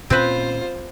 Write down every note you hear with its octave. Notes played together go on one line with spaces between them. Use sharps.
D2 A#2 C4 C#4 F4 B4 C5